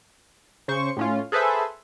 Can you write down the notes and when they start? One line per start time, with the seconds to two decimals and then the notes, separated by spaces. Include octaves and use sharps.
0.68 C#3 C5 C#6
0.97 A2 C#4 F4
1.32 G#4 A4 B4 C5 E5